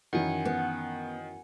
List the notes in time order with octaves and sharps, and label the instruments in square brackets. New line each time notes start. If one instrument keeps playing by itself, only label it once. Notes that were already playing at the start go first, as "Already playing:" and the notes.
[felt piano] F#2 E3 C#4 [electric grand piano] D#3 [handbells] F#5 G#5
[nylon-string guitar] B3